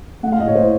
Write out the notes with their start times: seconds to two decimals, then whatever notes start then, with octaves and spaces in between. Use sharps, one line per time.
0.23 A3 F#5
0.32 F5
0.39 A2 D#5
0.48 C#5
0.55 A2 C5